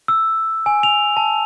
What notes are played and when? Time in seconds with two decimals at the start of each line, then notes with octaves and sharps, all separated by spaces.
0.08 E6
0.66 G#5
0.83 F7
1.17 A5